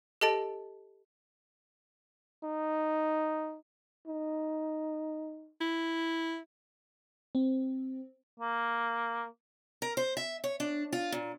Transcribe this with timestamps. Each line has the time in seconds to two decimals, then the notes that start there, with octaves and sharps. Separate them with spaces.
0.21 G4 A4 D#5 A5 A6 D7
2.44 D#4
4.07 D#4
5.61 E4
7.35 C4
8.40 A#3
9.82 A#4
9.97 C5
10.17 E5
10.44 C#5
10.60 D4
10.93 F4
11.12 A#2